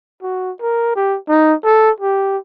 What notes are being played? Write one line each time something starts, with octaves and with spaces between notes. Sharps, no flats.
F#4
A#4
G4
D#4
A4
G4